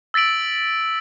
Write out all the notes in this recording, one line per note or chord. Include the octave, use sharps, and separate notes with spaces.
E6 A6 B6 D7 F#7